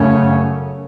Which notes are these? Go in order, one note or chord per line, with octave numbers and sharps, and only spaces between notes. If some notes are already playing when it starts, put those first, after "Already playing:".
Already playing: F#2 C#3 A3 C#4